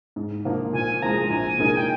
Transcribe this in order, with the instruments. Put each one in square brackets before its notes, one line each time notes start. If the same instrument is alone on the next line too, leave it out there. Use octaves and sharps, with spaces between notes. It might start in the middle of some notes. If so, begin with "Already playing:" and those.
[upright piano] G#2
F3 A#3 D#4
[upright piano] A#2 [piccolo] G#5
[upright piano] F3 G#3 [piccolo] A#5
[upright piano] A#1 [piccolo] G#5
[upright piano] A#2 G#3 D#4 A#4
[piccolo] G5